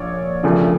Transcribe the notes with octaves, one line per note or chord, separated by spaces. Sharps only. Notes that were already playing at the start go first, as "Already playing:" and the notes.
Already playing: A#1 A#2 C#5 D5
E1 D2 C#3 F3 A3